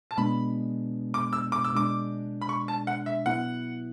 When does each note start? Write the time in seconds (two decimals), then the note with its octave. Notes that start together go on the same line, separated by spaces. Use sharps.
0.11 A5
0.17 B2 G#3 B3 D4 B5
1.14 D6
1.33 E6
1.52 D6
1.64 E6
1.72 B2 G#3 D4 D6
2.41 B5
2.49 C#6
2.68 A5
2.87 F#5
3.06 E5
3.26 B2 F#3 B3 E4 F#5